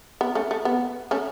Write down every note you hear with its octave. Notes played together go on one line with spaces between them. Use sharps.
B3
A3 C#4
A3
B3
A3 C#4